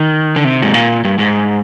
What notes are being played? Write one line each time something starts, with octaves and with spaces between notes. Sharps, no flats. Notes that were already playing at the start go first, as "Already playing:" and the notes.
Already playing: D#3
D3
C3
G#2
A#2
G2
G#2